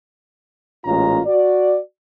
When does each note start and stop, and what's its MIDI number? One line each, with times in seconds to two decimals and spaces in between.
0.85 1.20 33
0.85 1.20 46
0.85 1.20 56
0.85 1.20 61
0.85 1.20 65
0.85 1.20 82
1.26 1.78 66
1.26 1.78 74